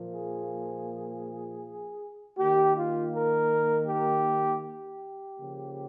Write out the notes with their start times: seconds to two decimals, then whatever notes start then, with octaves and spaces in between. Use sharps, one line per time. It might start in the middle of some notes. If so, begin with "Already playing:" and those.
Already playing: A#2 F3 A#3
0.13 G#4
2.38 D#3 A#3 G4
2.75 F4
3.13 A#4
3.87 G4
4.63 G4
5.37 C#3 F3 A#3